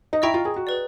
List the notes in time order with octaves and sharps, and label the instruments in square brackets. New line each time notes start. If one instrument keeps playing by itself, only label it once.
[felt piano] D#4
[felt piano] E4 [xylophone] D#5 G5 A#5 C#6
[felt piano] F4
G#4
F#4
[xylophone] G#4 B4 D5